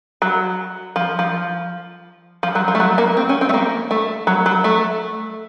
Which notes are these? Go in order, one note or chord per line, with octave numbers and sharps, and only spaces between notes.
F#3
F3
F3
F3
F#3
F3
A3
F#3
A#3
C4
C#4
C4
A3
A#3
A3
F#3
F#3
A3